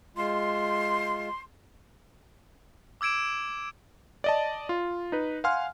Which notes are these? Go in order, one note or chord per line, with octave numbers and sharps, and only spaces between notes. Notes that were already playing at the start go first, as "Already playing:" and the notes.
G#3 F4 C6
D6 E6 G#6 D7 E7
D5 D#5 A5
F4
D#4 B4
F5 F#5 G#5 C6 F6